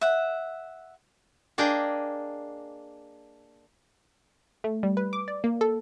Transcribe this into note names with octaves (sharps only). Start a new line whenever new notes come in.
E5 F#5
A#3 D4 G#4 D#5 G5
A3
G3
B4
D6
D5
A#3
A4